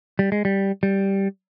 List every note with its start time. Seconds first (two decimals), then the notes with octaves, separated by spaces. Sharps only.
0.19 G3
0.32 G#3
0.45 G3
0.83 G3